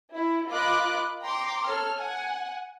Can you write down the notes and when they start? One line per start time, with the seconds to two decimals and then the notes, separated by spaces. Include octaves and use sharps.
0.13 E4
0.49 F4 A#4 D#5 B5 D6 F#6
1.22 G5 A#5 C6 D6
1.66 A4 C#5 F6
1.97 F#5 G#5